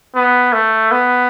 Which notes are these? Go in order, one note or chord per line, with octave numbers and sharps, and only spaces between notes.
B3
A3
B3